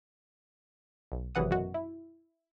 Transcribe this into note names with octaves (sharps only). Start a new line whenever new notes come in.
B1
G#1 F#2 C3 E3 F#5 D#6
F#2 B2 F#4
E4